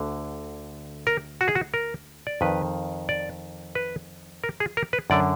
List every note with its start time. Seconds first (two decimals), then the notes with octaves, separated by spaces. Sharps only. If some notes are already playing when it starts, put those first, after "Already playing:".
Already playing: D2 D3
1.07 A#4
1.41 F#4
1.48 G#4
1.55 F#4
1.74 A#4
2.27 D5
2.41 F2 D#3 B4
3.09 D5
3.75 B4
4.44 A#4
4.60 G#4
4.77 A#4
4.93 B4
5.10 F#2 D3 D5